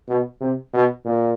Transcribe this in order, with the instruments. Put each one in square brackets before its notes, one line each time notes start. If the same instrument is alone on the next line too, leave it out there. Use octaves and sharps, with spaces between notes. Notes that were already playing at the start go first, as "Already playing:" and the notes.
[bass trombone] B2
C3
B2
A#2